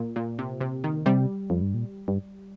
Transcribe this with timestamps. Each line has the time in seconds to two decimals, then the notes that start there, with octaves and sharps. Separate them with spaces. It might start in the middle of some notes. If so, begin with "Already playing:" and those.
Already playing: A#2
0.16 A#2
0.39 C3
0.61 C3
0.84 D#3
1.06 C3 G3
1.50 F2
1.62 G2
1.74 A#2
2.08 G2